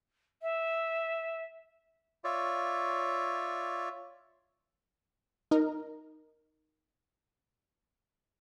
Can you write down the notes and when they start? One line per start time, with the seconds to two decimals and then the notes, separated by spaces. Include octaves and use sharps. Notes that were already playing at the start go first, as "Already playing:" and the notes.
0.42 E5
2.24 F4 C#5 D5 E5
5.51 D#4 A#4